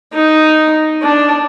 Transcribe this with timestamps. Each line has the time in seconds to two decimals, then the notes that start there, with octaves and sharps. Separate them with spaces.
0.13 D#4
1.02 D4